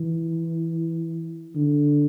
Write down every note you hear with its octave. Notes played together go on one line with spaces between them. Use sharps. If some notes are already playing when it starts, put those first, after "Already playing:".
Already playing: E3
D3